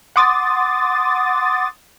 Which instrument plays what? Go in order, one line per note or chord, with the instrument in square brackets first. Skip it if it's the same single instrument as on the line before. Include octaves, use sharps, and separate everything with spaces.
[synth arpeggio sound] F#5 C6 D6 D#6 A6